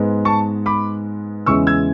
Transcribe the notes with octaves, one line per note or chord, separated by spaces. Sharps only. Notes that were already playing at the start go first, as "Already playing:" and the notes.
Already playing: G#2 G#3 B3
A5 C#6
B5 D6
E2 C#3 E3 G#3 C#4 C#6 E6
E6 G#6